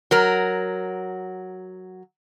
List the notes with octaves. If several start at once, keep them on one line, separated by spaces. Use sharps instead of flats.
F#3 A#4